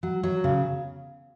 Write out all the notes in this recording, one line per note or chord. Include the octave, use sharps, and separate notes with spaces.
F#3
F#3
C#3